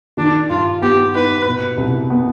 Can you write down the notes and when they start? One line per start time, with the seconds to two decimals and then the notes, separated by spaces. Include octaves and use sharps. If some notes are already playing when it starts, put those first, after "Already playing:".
0.17 D#3 D4
0.50 G2 F4
0.82 B3 G4
1.14 D#4 B4
1.46 B2
1.78 C2
2.10 B3